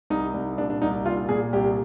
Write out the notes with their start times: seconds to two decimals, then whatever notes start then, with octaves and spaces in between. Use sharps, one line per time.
0.10 C2 D#4
0.34 C2
0.58 A#2 D4
0.70 D4
0.82 C2 D#4
1.06 A#2 F4
1.29 A#2 G#4
1.53 C2 G4